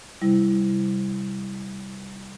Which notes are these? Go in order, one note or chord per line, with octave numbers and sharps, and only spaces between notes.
C3 G3 E4